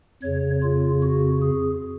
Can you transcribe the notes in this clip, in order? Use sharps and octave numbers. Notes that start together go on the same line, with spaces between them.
F2 C#3 C#5
F4
F#4
G#4